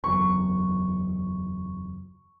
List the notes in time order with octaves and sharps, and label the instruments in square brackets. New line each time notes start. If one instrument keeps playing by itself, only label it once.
[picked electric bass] F#1 E2 F#3 [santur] C#6